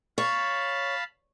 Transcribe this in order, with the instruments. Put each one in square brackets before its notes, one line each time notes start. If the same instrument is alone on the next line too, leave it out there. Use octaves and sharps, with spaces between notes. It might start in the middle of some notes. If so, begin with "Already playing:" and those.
[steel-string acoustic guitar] C#5 [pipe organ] F5 A5 B5